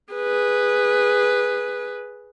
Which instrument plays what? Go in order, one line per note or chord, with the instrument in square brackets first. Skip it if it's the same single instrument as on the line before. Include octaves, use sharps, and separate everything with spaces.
[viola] G#4 B4